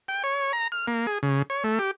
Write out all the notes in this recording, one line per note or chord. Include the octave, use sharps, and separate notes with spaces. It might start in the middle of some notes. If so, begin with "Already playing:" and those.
G5
C#5
A#5
F6
A#3
G#4
C#3
C#5
A3
G4